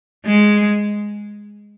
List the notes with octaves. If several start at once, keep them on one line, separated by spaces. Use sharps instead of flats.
G#3